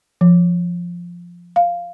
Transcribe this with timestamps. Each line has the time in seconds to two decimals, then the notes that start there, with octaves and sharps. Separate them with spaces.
0.21 F3
1.56 F5